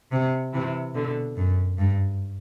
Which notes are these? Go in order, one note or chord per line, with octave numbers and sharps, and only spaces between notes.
C3
C3 E3
B2 D3
F#2
G2